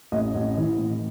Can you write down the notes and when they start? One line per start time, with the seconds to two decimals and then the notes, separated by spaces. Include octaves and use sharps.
0.12 A1 D#5
0.35 A1
0.57 E3
0.78 A2